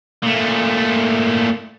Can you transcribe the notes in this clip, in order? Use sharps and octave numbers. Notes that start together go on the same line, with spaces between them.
A#2 A3